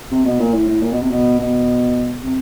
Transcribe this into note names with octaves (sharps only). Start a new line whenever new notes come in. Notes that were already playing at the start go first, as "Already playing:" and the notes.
C3
B2
A#2
A2
A2
A#2
B2
C3
B2
B2
C3